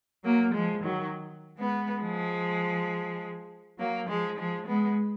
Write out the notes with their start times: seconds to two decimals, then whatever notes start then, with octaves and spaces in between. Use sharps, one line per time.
0.24 F#3 A#3
0.53 F3 G#3
0.83 D#3 F#3
1.57 G#3 B3
2.01 F3 G#3
3.78 F#3 A#3
4.08 F3 G#3
4.37 F3 G#3
4.67 G#3 B3